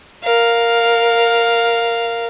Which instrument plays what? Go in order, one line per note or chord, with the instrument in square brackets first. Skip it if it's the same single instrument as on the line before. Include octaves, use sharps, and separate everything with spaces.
[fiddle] A#4 F5